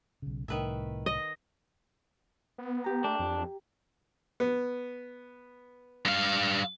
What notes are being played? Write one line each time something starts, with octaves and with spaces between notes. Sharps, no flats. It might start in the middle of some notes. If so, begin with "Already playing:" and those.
B1 C#3
C2 A2 D#3 B4 E5
D#5
B3
G4 A#5
A3 D4
F2
B3
G2 F5